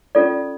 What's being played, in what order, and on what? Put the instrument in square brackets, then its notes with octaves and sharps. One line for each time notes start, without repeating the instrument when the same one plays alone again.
[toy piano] C#4 F4 A4 D5